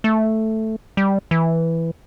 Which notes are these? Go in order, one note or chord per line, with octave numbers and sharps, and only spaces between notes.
A3
G3
E3